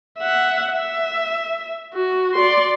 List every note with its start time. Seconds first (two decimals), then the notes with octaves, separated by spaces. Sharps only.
0.18 E5 F#5
0.72 E5
1.94 F#4
2.34 D5 C6